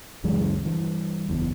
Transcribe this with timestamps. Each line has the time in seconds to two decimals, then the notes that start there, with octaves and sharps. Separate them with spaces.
0.24 C#2 F#2 E3 G#3
0.65 G2 E3
1.29 F#1 E2